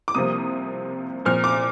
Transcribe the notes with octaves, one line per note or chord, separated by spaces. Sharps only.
D6
C2 C3 F3 A#3 D#6
A#2 F3 C4 F6
D6